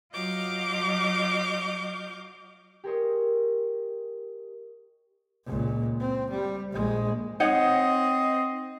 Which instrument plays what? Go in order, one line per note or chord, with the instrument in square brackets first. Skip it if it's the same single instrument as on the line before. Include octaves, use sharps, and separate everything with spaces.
[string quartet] F#3 F4 D#5 D6 F6 G6
[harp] G4 G#4 A#4 C5 C#5 D#5
[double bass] C#2 A#2
C4
G3
A#1 G#3
[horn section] C4 D#5 [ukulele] D#4 C#5 F#5